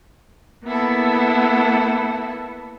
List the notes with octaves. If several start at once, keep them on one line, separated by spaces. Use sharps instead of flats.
A#3 B3 E4 A4